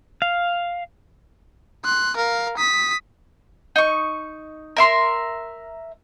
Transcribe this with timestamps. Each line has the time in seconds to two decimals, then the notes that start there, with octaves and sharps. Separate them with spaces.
0.22 F5
1.85 C6 F#6
2.17 A#4 F5
2.57 D#6 B6
3.76 D#4 C#6
4.77 A#4 E5 C6